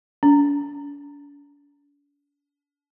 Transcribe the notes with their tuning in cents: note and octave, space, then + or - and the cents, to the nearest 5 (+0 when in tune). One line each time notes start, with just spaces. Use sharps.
D4 -45